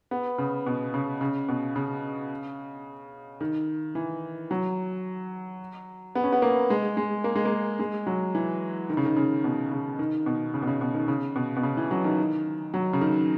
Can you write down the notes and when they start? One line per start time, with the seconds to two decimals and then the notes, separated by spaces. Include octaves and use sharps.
0.11 B3
0.38 C#3
0.67 B2
0.94 C#3
1.21 C#3
1.49 B2
1.76 C#3
3.41 D#3
3.95 E3
4.51 F#3
6.15 B3
6.24 C#4
6.32 B3
6.42 A#3
6.70 G#3
6.97 G#3
7.24 A#3
7.36 G#3
7.45 A#3
7.80 G#3
8.07 F#3
8.35 E3
8.90 D#3
8.97 C#3
9.05 D#3
9.16 C#3
9.44 B2
9.71 C#3
9.99 D#3
10.26 B2
10.54 C#3
10.62 B2
10.67 C#3
10.81 B2
10.94 D#3
11.08 C#3
11.36 B2
11.57 B2
11.63 C#3
11.77 E3
11.91 F#3
12.04 D#3
12.74 F#3
12.93 C#3
13.01 D#3